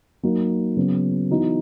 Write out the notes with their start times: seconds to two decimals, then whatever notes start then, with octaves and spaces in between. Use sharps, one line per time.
0.23 F#3 A#3 D#4 F#4
0.77 C#3 F#3 B3
1.30 E3 B3 D#4 F#4